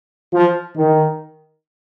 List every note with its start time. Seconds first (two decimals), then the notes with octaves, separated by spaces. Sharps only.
0.33 F3
0.76 D#3